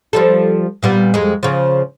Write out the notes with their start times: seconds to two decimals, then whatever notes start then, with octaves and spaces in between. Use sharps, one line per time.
0.13 F3 G3 A4
0.83 A#2 G3 B3
1.14 F2 G#3
1.43 C#3 F3